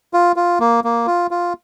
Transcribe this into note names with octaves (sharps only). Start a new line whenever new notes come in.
F4
F4
A#3
A#3
F4
F4